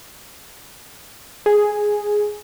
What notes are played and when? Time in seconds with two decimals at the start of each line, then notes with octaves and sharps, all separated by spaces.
1.46 G#4